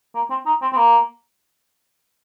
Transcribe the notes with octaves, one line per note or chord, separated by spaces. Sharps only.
A#3
C4
D#4
C4
C4
A#3